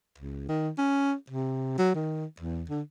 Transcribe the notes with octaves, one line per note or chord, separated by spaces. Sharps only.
C#2
D#3
C#4
C3
F#3
D#3
E2
D3